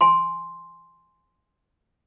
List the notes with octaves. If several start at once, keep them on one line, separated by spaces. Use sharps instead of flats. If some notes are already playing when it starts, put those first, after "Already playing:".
G#5 C6